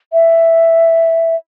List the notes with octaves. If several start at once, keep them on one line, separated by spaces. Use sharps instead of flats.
E5